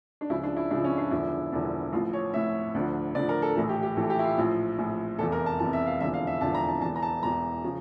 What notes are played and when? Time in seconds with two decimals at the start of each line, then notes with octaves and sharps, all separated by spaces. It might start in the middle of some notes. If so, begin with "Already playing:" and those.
0.21 D4
0.29 C#2 C#3 F3 E4
0.43 D4
0.57 E4
0.71 C#2 C#3 F3 D4
0.84 C#4
0.98 D4
1.11 E1 E2 D3 F3 E4
1.52 E1 E2 D3 F3
1.93 A1 A2 F3 F4
2.13 C#5
2.34 A1 A2 F3 E5
2.74 D2 D3 F3
3.15 D2 D3 F3 D5
3.29 A#4
3.42 A4
3.56 A#1 A2 E3 A4
3.69 G4
3.83 G4
3.97 A#1 A2 E3 A4
4.10 G4
4.19 E4
4.24 F4
4.38 A#1 A2 F3
4.78 A#1 A2 F3
5.18 F1 E2 E3 A4
5.32 A#4
5.46 A5
5.59 F1 E2 E3 A5
5.73 E5
5.87 F5
6.00 E1 E2 D3 F3 E5
6.14 F5
6.27 E5
6.41 E1 E2 D3 F3 A5
6.55 A#5
6.68 A5
6.81 E1 E2 E3 A5
6.96 A#5
7.02 A5
7.22 E1 E2 E3 A#5
7.63 C#3 F3